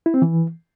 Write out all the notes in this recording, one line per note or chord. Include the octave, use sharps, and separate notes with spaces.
E4
C4
E3